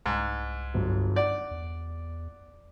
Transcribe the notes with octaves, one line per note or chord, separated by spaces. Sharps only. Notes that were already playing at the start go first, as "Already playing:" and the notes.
C2 G#2
G1 F#3
D5 F#5
E2